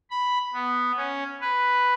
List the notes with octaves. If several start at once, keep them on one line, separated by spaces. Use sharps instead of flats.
B5
B3
C#4
B4